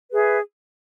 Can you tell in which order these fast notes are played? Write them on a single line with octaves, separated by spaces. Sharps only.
B4 G#4 E5